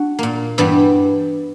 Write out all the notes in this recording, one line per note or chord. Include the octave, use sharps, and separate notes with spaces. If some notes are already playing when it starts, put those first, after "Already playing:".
Already playing: D4 F#4
A#2 A#3
G2 E3 G3 B3 G4